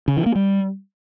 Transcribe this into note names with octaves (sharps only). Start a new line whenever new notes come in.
C#3
E3
A#3
G3